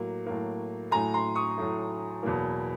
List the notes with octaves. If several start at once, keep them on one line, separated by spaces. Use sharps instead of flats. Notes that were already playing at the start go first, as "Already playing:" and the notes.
Already playing: A2 F#3 A#3
A2 F#3 A#3
A2 F#3 A3 G#5 A#5
A#5 C6
C#6 D#6
A2 F#3 A3
E2 B2 F#3 A#3